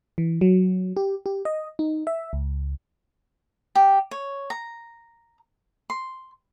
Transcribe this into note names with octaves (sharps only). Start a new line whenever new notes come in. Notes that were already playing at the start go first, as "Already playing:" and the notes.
E3
F#3
G4
G4
D#5
D#4
E5
C#2
G4
C#5
A#5
C6